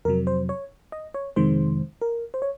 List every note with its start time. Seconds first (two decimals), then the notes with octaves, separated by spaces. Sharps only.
0.05 F2 C3 F#3 A#4
0.27 C5
0.49 C#5
0.92 D#5
1.14 C#5
1.36 F2 C3 D#3 G#3 C5
2.02 A#4
2.34 C5
2.42 C#5